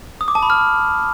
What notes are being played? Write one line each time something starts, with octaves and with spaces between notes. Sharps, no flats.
D#6
D6
A5
B5
F6